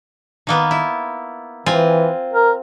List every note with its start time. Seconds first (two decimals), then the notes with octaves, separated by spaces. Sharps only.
0.47 D#3 A#3 B3
0.71 E4
1.66 E3 C4 F4 G#5
2.33 A#4